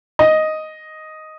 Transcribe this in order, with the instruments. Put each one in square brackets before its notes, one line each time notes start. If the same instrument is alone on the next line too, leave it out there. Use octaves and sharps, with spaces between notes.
[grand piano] D#5